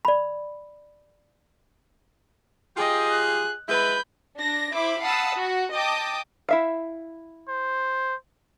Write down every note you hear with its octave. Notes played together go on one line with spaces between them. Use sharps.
D5 B5
F4 G4 G#4 D#5 G5
F#6
G#3 E4 B4 B5 G6
D4 A#6
E4 C5 E5 B5 D6
F5 F#5 A5 B5 D#6 E6
F#4
D#5 G5 A5 D6 D#6
E4 E5 F5
C5